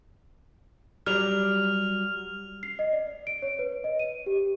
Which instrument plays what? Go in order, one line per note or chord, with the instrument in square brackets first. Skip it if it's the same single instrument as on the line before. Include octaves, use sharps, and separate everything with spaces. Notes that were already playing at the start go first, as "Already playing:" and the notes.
[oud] F#3 G3 D5 [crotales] F6 F7
[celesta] C7
D#5
D5
D7
C#5
B4
D#5
D#7
G4